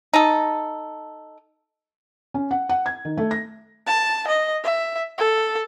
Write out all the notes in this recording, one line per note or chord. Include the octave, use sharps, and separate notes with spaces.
D#4 A4
C#4
F#5
F#5
G#6
D#3
A3
A#6
A5
D#5
E5
A4